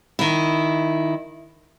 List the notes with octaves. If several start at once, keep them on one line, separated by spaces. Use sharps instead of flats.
D#3 E4